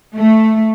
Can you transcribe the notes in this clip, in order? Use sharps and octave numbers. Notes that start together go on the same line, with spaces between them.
A3